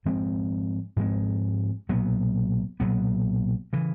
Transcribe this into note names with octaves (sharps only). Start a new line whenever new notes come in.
G#2 F3 G#3 C4
G#2 F3 G#3 C4
B1 A#2 F#3 B3
B1 A#2 F#3 B3
C#3 E3